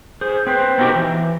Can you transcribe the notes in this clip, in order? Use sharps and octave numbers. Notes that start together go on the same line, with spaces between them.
G#4 C5
C4 B4 C5
B3 C4 D#4 F#4 G4 A#4
E3